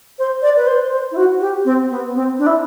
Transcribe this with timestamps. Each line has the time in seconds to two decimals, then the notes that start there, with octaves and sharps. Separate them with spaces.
0.19 C5
0.42 D5
0.56 B4
0.66 C5
0.92 C5
1.11 E4
1.17 F#4
1.41 G4
1.65 C4
1.90 B3
2.15 C4
2.39 D4
2.47 E4